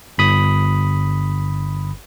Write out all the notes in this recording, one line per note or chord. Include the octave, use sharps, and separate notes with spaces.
G1 B5 D#6